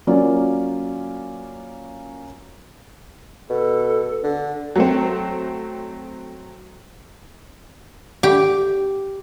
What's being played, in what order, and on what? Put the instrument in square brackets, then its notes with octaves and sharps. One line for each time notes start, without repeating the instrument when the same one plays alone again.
[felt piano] F#3 A#3 C#4 F4 D5
[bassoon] B2 [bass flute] A4
[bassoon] D3
[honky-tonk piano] F#3 A3 C4
[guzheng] G4